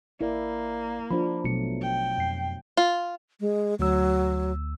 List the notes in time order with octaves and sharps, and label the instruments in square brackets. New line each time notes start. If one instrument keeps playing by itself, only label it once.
[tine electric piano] A1 A#4 D5 [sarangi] A#3 [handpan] E4
[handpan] F3 D4 [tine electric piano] F4 C5 B5
[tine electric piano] A1 C#7 [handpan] B2 F#3 A3
[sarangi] G5
[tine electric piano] F2 C7
[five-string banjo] F4
[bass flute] G#3
[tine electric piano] D2 E6 [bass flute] F#3